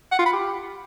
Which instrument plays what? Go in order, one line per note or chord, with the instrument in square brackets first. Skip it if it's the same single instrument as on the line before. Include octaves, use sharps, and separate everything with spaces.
[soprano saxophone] F#5
F4
B5
G4